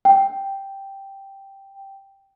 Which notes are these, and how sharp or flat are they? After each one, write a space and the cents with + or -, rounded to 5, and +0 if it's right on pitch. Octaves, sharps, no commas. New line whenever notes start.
G5 +0